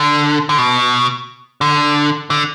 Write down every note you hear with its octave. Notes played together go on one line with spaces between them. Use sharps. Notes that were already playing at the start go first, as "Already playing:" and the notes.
Already playing: D3
D3
B2
D3
D3